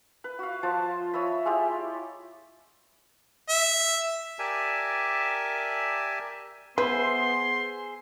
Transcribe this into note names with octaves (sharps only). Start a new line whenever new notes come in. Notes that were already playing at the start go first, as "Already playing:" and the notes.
B4
F#4 F5
F3 F4 C5 A5
C#5 D#5 E5 B5
G#3 E4 F4 G4
E5
G4 A#4 D5 E5 G#5 A5
B3 G#4 B4 C5 E5 C6